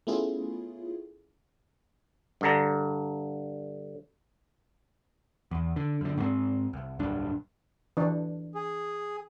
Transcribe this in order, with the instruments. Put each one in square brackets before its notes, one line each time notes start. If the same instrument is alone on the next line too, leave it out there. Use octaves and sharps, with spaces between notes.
[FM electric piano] A3 B3 C#4 E4 F4 G#4
[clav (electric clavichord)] G2 D3 A#5
[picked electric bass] E2
D3
F#2 D3
G#2 G3 C4
C2
D1 B1 G2 D4
[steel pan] E3 D4
[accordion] G#4